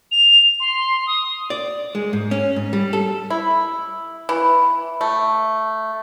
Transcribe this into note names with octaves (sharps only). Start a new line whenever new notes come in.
F7
C6
D#6
D5
G#3
G#2
C#4
G#2
G3
A4
E4
E3
A3